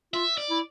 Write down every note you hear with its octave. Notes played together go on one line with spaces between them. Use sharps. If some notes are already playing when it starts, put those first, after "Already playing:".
F4 E5
D5
E4